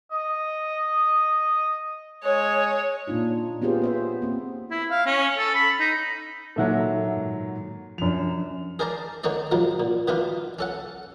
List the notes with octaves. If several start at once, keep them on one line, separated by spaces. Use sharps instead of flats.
D#5
G#3 C#5
A#2 A#3 D4 D#4 F4
B3 C#4 F4 G4 G#4 C5
B3 C5 E5
A#3 C4
E4
F5
C#4
A4
B5
D#4
A#2 D#3 F#3 A4 E5 F#5
G#2
F#2 F3 D4 F7
G#4 A#4 C5 D5 A5 A#5
D3 D#3 D4 D#4 C#5 D5
G#2 C3 D#3 F3 F#3
A#2
B2 D#3 E3 D4 D#4 F4
C#4 A4 F#5